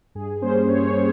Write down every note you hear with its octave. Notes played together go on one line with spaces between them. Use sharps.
G2 G#4
G3 A#3 C#4 C5
G2 C#5
C#5
G3 A#3